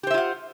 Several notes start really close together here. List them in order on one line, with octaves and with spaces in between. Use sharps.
G4 C5 E5 F4 F#5